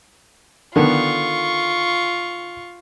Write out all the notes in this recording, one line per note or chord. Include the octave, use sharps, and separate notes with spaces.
D3 D#3 B3 F4 C#6